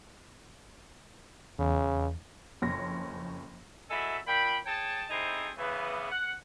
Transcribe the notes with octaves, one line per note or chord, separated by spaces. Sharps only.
E2 C#3
F#1 F2 C#5 C6 A#6
F#3 G#3 E4 A4 E5
A#2 G5 B5
G#4 C#5 G5 A5
C4 D#4 E4 G#4 A4 C5
C#3 E3 B3
F#5